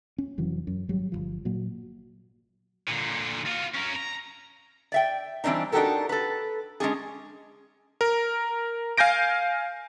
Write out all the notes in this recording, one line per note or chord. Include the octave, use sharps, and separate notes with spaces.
C#4
F1 E3 F#3
F#2
G#1 F#3 G3
G1 C2 F3
A#2 F#3
A#2 D3
F4 F#4
C#4 A#4
A#5
D5 E5 G5
E3 G3 C4 D4 D#4
D4 D#4 F#4 G4 A4 A#4
A4 B4
G#3 C#4 D4 G#4
A#4
F5 G#5 G6 A#6 D7